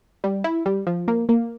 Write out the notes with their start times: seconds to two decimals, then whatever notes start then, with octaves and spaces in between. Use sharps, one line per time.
0.24 G3
0.44 E4
0.66 G3
0.87 F3
1.08 A#3
1.29 A#3